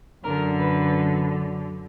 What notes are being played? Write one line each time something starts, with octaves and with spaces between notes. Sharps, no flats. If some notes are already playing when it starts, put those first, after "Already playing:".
F#2 D3 A#4
B4